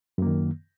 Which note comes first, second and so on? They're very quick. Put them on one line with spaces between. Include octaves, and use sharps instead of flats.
F#2 A#3 D#3